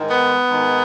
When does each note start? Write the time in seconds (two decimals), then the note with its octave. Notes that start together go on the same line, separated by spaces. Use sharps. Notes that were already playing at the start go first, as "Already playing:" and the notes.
Already playing: G#2 D#3
0.10 B3
0.47 G#2 D#3